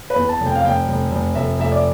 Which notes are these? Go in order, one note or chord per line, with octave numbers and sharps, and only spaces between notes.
B4
E2
A5
F1
G5
F5
F1 G5
F1
F1
F1 E5
F1 E5
D5